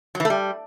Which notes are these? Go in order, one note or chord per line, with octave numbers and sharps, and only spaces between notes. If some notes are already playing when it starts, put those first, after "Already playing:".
F#3
E3
A3
G3